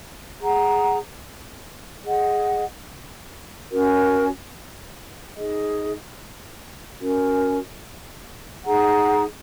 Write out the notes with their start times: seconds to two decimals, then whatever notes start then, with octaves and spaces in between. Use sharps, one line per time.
0.40 G#4 F#5 A#5
2.04 G#4 D#5 F#5
3.70 C#4 F#4 A#4
5.35 D#4 G#4 D#5
7.00 C#4 F#4 A#4
8.64 D#4 G#4 F#5 A#5